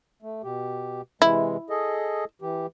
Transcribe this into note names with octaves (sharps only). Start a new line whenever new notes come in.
A3
B2 G4
C3 E3 G#3 E4
G#4 A4 D#5
E3 G4